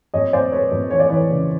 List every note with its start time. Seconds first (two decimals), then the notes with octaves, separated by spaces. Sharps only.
0.14 F2 C#5 D#5
0.33 F2 C5 D5
0.52 A3 B4 C#5
0.71 F2
0.90 E3 C#5
1.00 D5
1.10 E3 B4 C#5
1.29 C#3